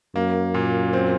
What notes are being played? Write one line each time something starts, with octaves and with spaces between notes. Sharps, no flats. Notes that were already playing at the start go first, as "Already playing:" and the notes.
F#2 A#3
A#2
C4